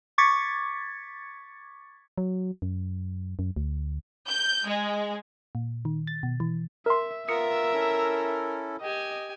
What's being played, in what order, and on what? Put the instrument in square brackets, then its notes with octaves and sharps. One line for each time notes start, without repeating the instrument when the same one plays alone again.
[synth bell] C#6 D6 G#6 A6 B6 C#7
[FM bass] F#3
F#2
F#2
D2
[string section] G6
G#3
[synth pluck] A#2
D#3
A6
B2
E3
[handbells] A#4 C6 [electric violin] E5
[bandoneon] B3 F4 [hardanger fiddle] A#4 [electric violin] E5 E6 [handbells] D#6 C#7
[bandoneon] C#4 E4 A4
[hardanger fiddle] G4 G#5 [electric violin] D#5